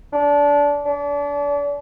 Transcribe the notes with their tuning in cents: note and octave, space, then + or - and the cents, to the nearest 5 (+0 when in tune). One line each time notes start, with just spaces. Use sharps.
D4 -20
D4 -35